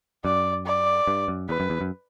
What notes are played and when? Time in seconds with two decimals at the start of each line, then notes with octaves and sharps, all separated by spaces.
0.24 F#2 D5
0.66 D5
1.07 G2
1.28 F#2
1.49 E2 B4
1.60 F#2
1.70 E2
1.81 F#2